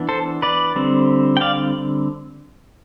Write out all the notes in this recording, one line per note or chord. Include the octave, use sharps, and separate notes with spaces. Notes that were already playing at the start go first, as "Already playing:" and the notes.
Already playing: E3 B3 D4
A4 C5
B4 D5
D3 G3 C4
G5
D5 F5